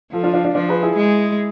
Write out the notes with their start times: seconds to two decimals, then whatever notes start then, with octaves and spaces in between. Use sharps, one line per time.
0.12 F3 F4 A4
0.23 D4 F4
0.34 D4 F4
0.44 D4 F4
0.55 F3 D4 F4
0.68 G#4 B4
0.82 E4 G#4
0.97 G#3